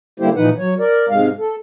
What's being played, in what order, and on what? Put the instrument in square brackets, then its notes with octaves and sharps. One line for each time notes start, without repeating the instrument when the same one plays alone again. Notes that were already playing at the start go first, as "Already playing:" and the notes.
[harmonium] D3 G3 A#3 E4 G4 C5
A#2 E3 F3 D#4 B4 F#5
F#3 C#5
A#4 D5
G#2 C3 G#3 F5
A4